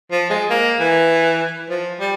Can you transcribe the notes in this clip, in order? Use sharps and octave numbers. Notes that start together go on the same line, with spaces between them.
F3
G#3
A#3
E3
F3
G3